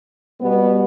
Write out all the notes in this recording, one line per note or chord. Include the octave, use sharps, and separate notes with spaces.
B2 G3 B3